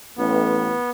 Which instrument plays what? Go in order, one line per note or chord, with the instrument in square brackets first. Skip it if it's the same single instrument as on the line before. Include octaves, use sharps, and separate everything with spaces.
[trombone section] A1 [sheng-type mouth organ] B3